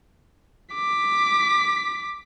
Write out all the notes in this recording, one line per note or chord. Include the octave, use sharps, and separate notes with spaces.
D6 B6